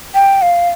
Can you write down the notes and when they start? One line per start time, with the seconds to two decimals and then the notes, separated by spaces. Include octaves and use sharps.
0.15 G5
0.42 F5